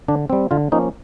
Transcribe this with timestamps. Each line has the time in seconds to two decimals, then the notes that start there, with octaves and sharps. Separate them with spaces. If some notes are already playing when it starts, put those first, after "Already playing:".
0.08 D3 D4
0.30 G3 C4
0.51 D3 F4
0.72 F3 A#3 C#4 D#4